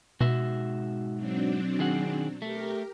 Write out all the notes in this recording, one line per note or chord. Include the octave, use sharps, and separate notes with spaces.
G#2 B2 F#4 E5
F#3 C4 D4
D#3 G#4 F#5
A3 G4 A#4